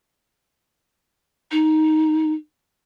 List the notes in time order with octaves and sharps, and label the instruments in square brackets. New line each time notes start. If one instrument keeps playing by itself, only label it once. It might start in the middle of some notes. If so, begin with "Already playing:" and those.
[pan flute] D#4